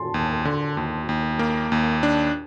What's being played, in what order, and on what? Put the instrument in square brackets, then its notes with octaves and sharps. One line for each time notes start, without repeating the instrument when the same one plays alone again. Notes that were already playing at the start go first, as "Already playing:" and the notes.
Already playing: [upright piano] A5 C6
[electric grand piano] D#2
D3
D#2
D#2
A#3
D#2
D4